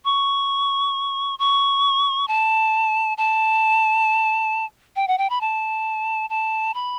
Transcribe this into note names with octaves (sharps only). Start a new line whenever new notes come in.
C#6
C#6
A5
A5
G5
F#5
G5
B5
A5
A5
B5